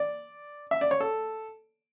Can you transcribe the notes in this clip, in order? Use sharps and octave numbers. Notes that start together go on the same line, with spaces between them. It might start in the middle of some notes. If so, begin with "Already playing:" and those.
Already playing: D5
E5
D5
C#5
A4